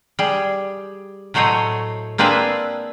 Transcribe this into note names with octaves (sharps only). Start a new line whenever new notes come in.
G3 G#4
A2 F#3 A3 C5 C#5 D#5
A#3 C4 D4 G#4 B4 E5